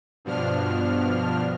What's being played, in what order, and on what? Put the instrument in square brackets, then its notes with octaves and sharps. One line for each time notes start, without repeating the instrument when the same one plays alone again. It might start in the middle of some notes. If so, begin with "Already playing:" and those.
[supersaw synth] G2 B2 F3 D4 F6